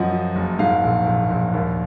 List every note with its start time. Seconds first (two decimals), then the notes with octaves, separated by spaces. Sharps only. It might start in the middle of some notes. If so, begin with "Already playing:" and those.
Already playing: F#2 F3 D#5 F#5
0.12 F3
0.36 F#1
0.59 G#2 F5
0.83 A#1
1.07 A#1
1.30 A#1
1.53 D#2